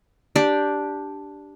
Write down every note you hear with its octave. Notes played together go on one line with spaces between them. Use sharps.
D4 G4 D5